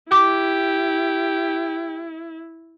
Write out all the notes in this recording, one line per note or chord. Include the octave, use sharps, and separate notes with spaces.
E4 G4 D6